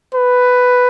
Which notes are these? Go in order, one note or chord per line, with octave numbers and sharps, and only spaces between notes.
B4